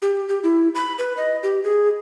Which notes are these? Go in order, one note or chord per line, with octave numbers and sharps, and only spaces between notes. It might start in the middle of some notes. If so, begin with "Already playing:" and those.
G4
G4
E4
B5
B4
D#5
G4
G#4